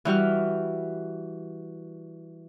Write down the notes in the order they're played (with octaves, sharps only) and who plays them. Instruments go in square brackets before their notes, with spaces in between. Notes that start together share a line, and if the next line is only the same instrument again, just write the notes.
[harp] E3 G3 F#4 F6